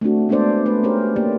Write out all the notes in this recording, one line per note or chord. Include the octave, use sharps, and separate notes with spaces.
A3 C4 D4 F#4
G#3 B3 D4 A4 C5 D5
A3 B4
C#4 G4 A#4 C5
A#3 G4 D5